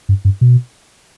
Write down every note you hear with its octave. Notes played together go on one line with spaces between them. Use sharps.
G2
G2
B2